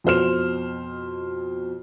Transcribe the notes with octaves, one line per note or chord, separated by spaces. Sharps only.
F2 B2 C5 F6 E7